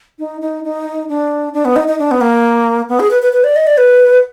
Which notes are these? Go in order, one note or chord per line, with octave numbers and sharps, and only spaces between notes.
D#4
D#4
D#4
D4
D4
B3
D#4
D#4
D4
B3
A#3
B3
G#4
B4
B4
B4
D5
D#5
D5
B4